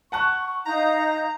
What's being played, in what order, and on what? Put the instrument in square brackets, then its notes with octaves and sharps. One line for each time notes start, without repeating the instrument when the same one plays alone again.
[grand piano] F#5 A5 F#6 [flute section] C#6
[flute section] D#4 F5 G6 [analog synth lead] A#5